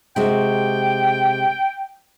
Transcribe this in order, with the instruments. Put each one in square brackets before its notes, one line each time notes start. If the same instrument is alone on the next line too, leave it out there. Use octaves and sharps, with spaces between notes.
[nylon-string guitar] C3 G#3 F#4 [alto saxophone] G5